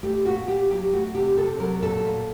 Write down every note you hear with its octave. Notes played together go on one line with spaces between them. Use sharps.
A3 G4
A#2 F#4
A#2 G4
F#3 G4
A3 F#4
C3 G4
C3 A4
F#3 A#4
A#2 A4
A#2